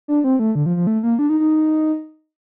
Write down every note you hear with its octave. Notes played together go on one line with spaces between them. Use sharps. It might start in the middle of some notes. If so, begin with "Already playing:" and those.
D4
C4
A3
D3
F3
F3
A3
A#3
D4
D#4
D#4